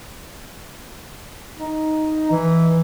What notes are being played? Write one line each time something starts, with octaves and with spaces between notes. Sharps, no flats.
D#4
E3